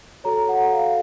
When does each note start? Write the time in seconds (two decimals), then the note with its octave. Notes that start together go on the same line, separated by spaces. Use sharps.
0.24 F#4 A4 C#5 A#5
0.49 F#5
0.73 F5